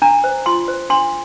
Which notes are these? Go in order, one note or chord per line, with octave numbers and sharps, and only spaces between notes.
D4 A#5
C5
F4 C6
C5
D4 C6